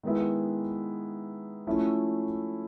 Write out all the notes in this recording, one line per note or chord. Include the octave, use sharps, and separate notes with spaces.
D#3 G#3 B3 E4
F3 A3 C#4 E4